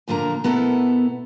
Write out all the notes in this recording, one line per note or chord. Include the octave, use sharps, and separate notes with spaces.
F2 A#2 D3 A#3 A#5
B2 B3 E4 A4 A#4